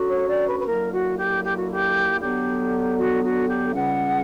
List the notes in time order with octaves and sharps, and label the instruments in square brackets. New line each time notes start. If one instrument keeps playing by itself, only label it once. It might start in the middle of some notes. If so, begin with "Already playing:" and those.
Already playing: [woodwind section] D2 D3 F#3 C#4 F#4
[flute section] C#5
D5
B4
B4
[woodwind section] F#2 D3 F#3 A#3 E4 [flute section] A#4
[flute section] F#4
G4
G4
F#4
G4
[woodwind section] D3 F#3 B3 [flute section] G4
[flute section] F#4
F#4
G4
[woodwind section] C#2 C#3 G3 C#4 [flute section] F#5